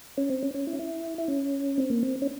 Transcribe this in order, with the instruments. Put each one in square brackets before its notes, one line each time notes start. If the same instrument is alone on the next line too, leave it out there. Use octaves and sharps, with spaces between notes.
[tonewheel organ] C#4
C4
C#4
C#4
E4
C#4
E4
E4
C#4
C4
A#3
C4
C#4